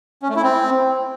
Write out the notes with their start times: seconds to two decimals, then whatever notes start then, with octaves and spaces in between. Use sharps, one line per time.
0.22 C#4
0.29 A3
0.36 E4
0.43 C4